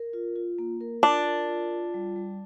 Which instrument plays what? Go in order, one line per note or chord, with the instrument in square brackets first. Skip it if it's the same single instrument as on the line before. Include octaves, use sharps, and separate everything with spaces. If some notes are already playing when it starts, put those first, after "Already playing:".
Already playing: [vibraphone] A#4
F4
F4
A#3
A#4
[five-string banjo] D4 [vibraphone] F4
[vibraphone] A#4
F4
F4
G3
G3